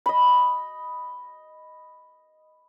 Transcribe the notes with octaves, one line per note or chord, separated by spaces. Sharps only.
D#5 B5